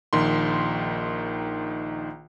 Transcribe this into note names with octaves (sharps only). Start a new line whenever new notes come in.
A#1 D#3 C6